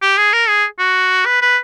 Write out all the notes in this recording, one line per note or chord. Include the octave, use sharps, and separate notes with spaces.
G4
G#4
A#4
G#4
F#4
B4
B4